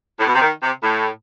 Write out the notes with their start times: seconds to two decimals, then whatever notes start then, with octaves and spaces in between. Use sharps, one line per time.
0.20 A2
0.27 B2
0.35 C3
0.41 D#3
0.62 C3
0.83 A2